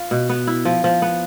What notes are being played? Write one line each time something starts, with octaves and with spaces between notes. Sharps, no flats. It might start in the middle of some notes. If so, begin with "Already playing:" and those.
Already playing: F4
B2
B3
E4
F3
F3
B3